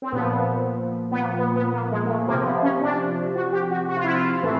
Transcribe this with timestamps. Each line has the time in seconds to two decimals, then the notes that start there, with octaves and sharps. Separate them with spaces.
0.02 C4
0.12 A#2 F3 B3
1.11 B3
1.20 A#3
1.38 B3
1.56 B3
1.73 A#3
1.92 G#3
2.05 A#3
2.09 A3
2.28 C3 F3 A#3
2.45 B3
2.63 C#4
2.81 D4
3.35 F#4
3.53 G4
3.71 F#4
3.89 F#4
3.97 F4
4.04 E4
4.12 F4
4.43 A2 E3